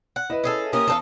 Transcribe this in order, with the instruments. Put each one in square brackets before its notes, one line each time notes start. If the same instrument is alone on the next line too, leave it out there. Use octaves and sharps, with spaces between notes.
[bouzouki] F#5
[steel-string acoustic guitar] E4 [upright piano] B4 D#5
[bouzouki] C#4 G#4 A4
[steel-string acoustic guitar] A#3 C#4 G4 [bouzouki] A#4 [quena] D#6
[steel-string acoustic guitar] E2 [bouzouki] A4 A#4 F5